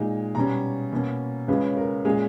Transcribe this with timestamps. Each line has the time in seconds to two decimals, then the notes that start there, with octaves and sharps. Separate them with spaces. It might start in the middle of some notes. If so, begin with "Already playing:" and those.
Already playing: A#2 G#3 D#4
0.35 B2 G3 C#4 A#5
0.92 B2 A#3 C#4
1.48 C#2 C#3 G#3 C#4 B4
1.77 A#4
2.04 A#2 G#3 C#4 G#4